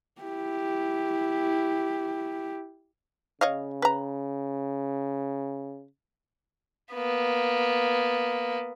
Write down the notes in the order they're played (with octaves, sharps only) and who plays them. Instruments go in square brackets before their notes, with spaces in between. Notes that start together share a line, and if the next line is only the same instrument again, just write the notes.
[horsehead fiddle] E4 G4
[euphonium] C#3 [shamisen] C#5 D#5 F5
[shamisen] B4 A#5
[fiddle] A#3 B3